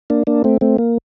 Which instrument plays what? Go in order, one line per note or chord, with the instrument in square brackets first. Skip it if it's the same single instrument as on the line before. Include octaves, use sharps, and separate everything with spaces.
[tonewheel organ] A#3 D4
A#3 D4
A3 C4
A3 C4
A#3